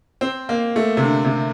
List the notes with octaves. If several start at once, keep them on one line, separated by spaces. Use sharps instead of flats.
C4
A#3
A3
C3
D3
C3